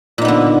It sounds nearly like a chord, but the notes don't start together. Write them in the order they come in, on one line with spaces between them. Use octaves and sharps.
A#2 D#4 B3 D3